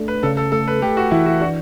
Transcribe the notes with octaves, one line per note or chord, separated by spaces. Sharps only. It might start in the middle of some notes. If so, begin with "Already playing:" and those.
Already playing: A3 D4
B4
C#3 A4
A4
A3 A4
B4
A3 G4
F#4
E3 E4
F#4
D4 F#4